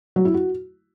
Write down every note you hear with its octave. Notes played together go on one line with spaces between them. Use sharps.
F#3
E4
F#4